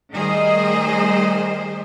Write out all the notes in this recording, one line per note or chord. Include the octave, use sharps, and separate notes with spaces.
D#3 G3 A3 G#4 C5 D#5